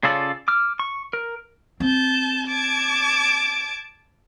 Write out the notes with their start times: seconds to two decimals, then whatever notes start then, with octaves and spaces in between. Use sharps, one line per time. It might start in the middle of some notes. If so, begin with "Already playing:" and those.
0.03 C#3 C#4 F4 A4 D5
0.48 D6 F6
0.80 C#6
1.13 A#4
1.80 C4 A5 G6
2.46 A5 D6 G#6